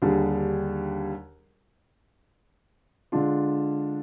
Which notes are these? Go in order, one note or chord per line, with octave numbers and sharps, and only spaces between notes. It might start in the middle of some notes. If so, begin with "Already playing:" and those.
D#2 D3 G3 D4 G#4
D3 G#3 D4 F4